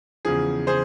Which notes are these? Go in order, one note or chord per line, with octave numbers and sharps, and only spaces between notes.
E2 C#3 F3 G#4
C#3 G#4 C5